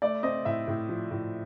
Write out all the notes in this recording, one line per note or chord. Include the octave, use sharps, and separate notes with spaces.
A3 D5
C4 D#5
A2 E5
A2
F3
A2